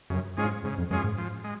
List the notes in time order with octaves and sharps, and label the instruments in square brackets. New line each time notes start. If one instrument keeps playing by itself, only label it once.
[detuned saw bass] F#2 [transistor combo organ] C#3
[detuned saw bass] G#2 [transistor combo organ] G#3 C#4 F4 G#4
[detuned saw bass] G#2 [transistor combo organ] C#3
[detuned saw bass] F2
[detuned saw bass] F#2 [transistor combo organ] G#3 C#4 F4 G#4
[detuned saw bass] G#2
[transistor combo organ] F3
G#3